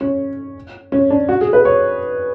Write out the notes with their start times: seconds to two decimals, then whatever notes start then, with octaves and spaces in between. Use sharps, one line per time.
0.01 C#4
0.92 C#4
1.10 D4
1.29 F#4
1.41 G#4
1.53 B4
1.65 C#5